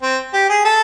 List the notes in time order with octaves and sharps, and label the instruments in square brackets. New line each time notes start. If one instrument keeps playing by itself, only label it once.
[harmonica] C4
G4
G#4
A4